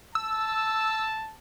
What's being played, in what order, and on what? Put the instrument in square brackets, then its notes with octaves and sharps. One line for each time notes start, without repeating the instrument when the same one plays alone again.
[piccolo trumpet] A5 [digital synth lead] E6